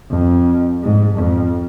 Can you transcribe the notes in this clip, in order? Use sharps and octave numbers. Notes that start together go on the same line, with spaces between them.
F2
G#2
F2